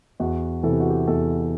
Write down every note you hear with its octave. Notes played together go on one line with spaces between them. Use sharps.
E2 F#4
C3 E3 A4
G4
F#4
G4
E2 A4